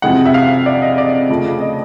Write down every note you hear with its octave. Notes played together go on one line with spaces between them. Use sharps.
F2 C3 E3 G#3 F#5
E5
F5
D5
D#5
D5
F2 C#3 F3 A3
D#5